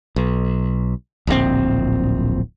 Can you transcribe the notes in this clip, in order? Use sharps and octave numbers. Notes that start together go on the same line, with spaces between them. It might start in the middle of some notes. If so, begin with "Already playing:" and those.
B1
D1 A#1 B2 C4